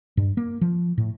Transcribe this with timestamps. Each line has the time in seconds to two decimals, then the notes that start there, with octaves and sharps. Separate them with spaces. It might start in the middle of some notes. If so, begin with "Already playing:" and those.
0.17 G2
0.37 A#3
0.61 F3
0.98 A2